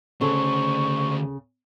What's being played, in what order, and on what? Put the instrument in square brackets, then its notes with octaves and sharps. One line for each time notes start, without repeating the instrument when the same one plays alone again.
[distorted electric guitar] D2 C5 [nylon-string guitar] C#3 A4 [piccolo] C#6